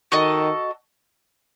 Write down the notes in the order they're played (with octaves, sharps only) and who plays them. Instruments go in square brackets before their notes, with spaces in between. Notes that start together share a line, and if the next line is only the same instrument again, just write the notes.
[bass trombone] D#3 [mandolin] F#4 A4 D#5